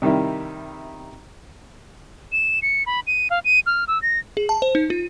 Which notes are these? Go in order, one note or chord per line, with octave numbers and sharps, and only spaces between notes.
C3 D#3 G3 D#4 E4
E7
C#7
B5
D#7
F5
D#7
F6
E6
A#6
G#4
A5
C5
D#4
F4